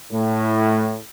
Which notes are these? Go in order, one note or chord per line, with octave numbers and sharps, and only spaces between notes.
A2